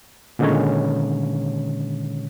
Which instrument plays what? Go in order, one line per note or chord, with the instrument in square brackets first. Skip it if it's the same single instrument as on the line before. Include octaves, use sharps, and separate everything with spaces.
[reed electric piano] A#2 D3 D#3 G#3 C#4 C#5